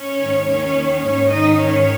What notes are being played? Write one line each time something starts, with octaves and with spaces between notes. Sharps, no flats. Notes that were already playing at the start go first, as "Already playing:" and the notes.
Already playing: C#4 C#5
G#2 D#3
D#2 D#3 C#4 C#5
D#2 D#3
G#2 D#3 C#4 C#5
G#2 D#3 D#4 D#5
G#2 D#3 C#4 C#5